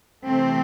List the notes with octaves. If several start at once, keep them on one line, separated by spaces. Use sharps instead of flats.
C3 E3 A3 C4